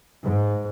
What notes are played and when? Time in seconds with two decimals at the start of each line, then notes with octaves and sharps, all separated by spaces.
0.23 G#2